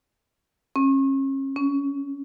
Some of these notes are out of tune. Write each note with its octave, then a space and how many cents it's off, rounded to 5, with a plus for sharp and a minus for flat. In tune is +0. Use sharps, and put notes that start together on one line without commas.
C#4 -35
C#4 +20